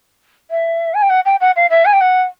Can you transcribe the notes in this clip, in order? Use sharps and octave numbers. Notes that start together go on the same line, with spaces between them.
E5
G#5
G5
F#5
G5
F#5
F5
E5
G#5
G5
F#5